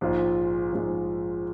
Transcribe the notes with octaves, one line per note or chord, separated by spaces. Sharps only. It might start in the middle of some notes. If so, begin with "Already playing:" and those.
A#1 G#2 G#3 F4
A#1 G#2 G#3 F4